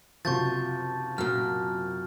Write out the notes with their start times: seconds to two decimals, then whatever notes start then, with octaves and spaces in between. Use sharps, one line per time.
0.25 F#1 C3 F3 F#4 C#6 G6 A6
1.18 F#2 A#2 F6